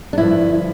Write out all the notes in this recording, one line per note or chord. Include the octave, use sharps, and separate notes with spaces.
D4
G2 D3 F3 E4